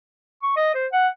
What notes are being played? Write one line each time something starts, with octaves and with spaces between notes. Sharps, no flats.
C#6
D#5
C5
F#5